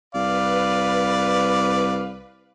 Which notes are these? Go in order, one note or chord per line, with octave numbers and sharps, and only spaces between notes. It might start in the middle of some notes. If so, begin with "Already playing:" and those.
C2 B4 D5 F5